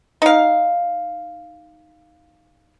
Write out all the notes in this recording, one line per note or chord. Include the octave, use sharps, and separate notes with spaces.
D#4 F5